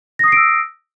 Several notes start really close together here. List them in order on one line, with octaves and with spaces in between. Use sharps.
A#6 D#6 C7 D7 E6